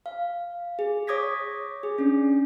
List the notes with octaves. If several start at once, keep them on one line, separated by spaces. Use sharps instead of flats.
F5
G#4
C#5 D6 D#6 G#6 A#6 B6
G#4
C#4 D4